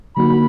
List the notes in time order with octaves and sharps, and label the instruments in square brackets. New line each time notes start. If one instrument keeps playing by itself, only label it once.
[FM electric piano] D3 F#3 A#3 D#4 F#4 [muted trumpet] B5